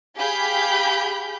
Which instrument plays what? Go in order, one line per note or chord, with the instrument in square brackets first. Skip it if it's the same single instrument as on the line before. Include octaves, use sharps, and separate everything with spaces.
[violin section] G4 G#4 F5 B5 G6